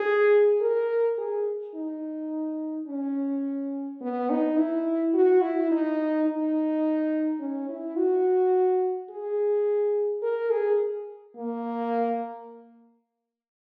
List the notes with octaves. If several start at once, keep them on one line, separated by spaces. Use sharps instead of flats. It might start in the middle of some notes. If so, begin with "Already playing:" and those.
Already playing: G#4
A#4
G#4
D#4
C#4
B3
D#4
E4
F#4
E4
D#4
D#4
C#4
E4
F#4
G#4
A#4
G#4
A#3